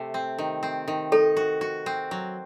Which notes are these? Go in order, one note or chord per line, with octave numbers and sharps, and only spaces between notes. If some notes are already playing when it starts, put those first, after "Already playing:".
Already playing: C3 A3
C4
D#3
C4
D#3
D#4 A4
F#4
F#4
C4
F#3